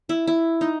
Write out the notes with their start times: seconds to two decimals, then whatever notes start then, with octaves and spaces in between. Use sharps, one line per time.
0.09 E4
0.27 E4
0.61 D#4